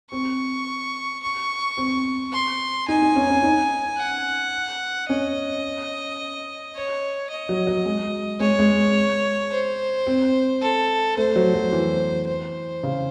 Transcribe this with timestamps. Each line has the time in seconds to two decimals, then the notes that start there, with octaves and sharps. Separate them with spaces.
0.11 C4 C#6
1.23 C#6
1.77 C4
2.33 C6
2.88 D#4 G#5
3.02 D#4
3.16 C#4
3.30 C#4
3.43 D#4
3.98 F#5
5.09 C#4 D#5
6.75 C#5
7.31 D#5
7.49 F#3
7.67 F#3
7.85 G#3
8.40 G#3 C#5
8.59 G#3
9.51 C5
10.07 C4
10.62 A4
11.17 A3 C5
11.36 F#3
11.54 F#3
11.72 E3
12.28 C5
12.83 C#3